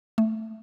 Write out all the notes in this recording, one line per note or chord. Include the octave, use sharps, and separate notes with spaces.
A3